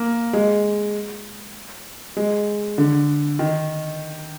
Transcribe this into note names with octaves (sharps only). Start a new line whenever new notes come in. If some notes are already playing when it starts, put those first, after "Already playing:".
Already playing: A#3
G#3
G#3
D3
D#3